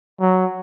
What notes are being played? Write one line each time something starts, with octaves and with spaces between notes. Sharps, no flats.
F#3